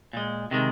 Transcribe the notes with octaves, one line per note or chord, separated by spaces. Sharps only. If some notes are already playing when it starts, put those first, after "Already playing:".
A#2 G#3
C3 D#3 G#3